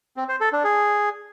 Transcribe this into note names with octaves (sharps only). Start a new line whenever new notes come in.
C4
C5
A4
D4
G#4